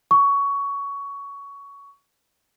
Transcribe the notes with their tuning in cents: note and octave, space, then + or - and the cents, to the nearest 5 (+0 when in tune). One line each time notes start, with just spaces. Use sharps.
C#6 +15